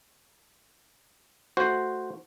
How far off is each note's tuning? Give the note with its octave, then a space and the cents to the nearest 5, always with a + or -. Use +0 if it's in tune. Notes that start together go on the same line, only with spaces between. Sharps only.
A3 +0 F#4 +0 C5 +0